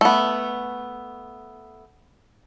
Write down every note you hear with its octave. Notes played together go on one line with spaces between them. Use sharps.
A3 B3